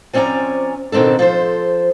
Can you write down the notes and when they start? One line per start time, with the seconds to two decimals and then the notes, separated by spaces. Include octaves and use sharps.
0.13 F3 C4 C#4 D5 G#5 A#5
0.92 B2 D#3 C4 D4 A4
1.19 F3 A4 C5